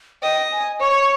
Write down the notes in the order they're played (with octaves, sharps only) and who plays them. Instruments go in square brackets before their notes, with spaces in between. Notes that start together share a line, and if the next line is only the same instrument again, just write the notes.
[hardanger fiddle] D#5 [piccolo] G5
[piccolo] G#5
[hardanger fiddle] C#5 [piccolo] C#6